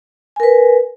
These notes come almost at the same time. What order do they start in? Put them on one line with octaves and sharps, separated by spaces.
G#5 A#4 B4